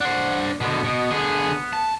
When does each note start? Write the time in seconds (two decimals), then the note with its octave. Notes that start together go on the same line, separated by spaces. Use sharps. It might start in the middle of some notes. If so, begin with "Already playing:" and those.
0.01 D4 C5 F#5
0.61 B2 D3 B3
0.84 B2
1.11 D3 G#4
1.73 A5